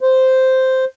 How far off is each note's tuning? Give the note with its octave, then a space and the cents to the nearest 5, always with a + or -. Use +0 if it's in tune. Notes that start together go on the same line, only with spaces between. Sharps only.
C5 -5